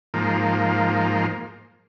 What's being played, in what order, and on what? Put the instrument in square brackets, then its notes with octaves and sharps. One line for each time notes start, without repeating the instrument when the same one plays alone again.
[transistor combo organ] G#2 F3 A#3